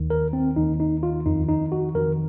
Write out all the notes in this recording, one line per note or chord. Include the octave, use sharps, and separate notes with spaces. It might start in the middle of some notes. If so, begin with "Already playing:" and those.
Already playing: D#2 D#3
A#4
C4
D#2 D#3 D#4
D#4
F4
F2 D#3 D#4
D#4
F#4
F2 D#3 A#4